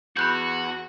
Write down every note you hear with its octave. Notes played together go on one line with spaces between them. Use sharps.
E2 F#4 B5 F#6 G6